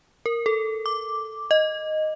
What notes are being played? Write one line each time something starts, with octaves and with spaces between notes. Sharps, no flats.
A#4
A4
D6
D#5